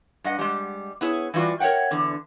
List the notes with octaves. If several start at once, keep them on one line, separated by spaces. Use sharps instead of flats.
G2 D#5 F#5
G3 G#3
B3 E4 G#4 C#5
E3 G3 F4 F#4 D5
A#4 C#5 E5 F#5 G5
E2 D3